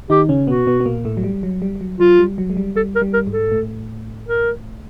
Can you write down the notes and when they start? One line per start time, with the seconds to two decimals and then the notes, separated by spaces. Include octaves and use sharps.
0.10 D#3 D#4 G4
0.29 C#3 C#4
0.47 B2 B3 F#4
0.67 B2 B3
0.80 B3
0.86 A#2 A#3
1.05 A2 A3
1.17 F#3
1.24 G3
1.43 F#3
1.62 G3
1.76 G3
1.81 F#3
2.00 F#3 F4
2.19 G3
2.38 F#3
2.50 G#3
2.57 G3
2.76 G3 A4
2.95 A#4
3.02 G3
3.14 A#4
3.27 G#2 G#3
3.33 A4
3.52 A2 A3
4.28 A#4